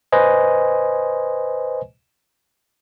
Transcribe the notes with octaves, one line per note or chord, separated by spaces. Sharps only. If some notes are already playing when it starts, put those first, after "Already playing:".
B4 C5 D#5 G#5